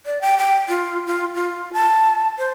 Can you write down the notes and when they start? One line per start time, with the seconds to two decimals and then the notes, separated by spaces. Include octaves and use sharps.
0.06 D5
0.21 G5
0.38 G5
0.69 F4
1.07 F4
1.35 F4
1.73 A5
2.39 C5